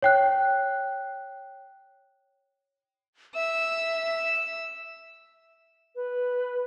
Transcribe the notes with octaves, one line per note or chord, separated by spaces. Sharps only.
C#5 G5 F#6
E5 E6
B4